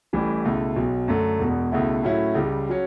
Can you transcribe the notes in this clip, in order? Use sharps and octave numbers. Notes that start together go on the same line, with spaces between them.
A1 A2 E3 G3
C#2 B2 A3 E4
B1 B2 F#3
F#2 D3 A3
E1 E2 B2
C#2 B2 A3 E4
A2 F#3 C#4 E4
C#2 C#3 G3
F#3 C#4